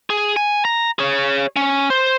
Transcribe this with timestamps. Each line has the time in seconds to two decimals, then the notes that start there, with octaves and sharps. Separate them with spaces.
0.10 G#4
0.36 G#5
0.65 A#5
0.99 G#4 C#5
1.56 C#4
1.90 C5